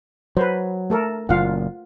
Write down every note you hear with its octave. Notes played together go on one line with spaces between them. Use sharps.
F#3 B4 C5
A3 A4 A#4
F#1 A#2 F4 F5 F#5